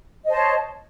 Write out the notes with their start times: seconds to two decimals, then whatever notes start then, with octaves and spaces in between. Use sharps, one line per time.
0.25 D#5
0.28 C5
0.31 A5
0.34 C#5